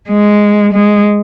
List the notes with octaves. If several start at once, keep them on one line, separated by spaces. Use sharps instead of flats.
G#3
G#3